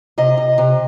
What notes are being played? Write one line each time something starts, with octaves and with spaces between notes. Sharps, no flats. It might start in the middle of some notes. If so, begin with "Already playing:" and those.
C3 D#5
C3
C3